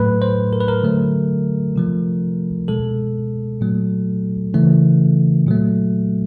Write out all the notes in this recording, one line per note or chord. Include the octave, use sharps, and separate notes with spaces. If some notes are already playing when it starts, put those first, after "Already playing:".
Already playing: A2 F#3 A3 B4
C5
A#4
B4
A#4
D3 F#3 A3
C3 F3 A3
B2 G#3 A4
A#2 F#3 A3
C#3 E3 A3
A#2 F#3 A3